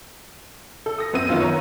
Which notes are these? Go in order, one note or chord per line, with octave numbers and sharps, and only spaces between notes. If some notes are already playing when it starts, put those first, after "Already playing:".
A4
D#6 A#6
F#2 B3 C4 E6 D#7
F#2 D#3 B3 F4 C5
C#5 A#5